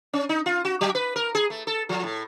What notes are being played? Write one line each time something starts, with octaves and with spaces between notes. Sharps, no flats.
C#4
D#4
F4
F#4
F#3
B4
A#4
G#4
A3
A4
F3
A2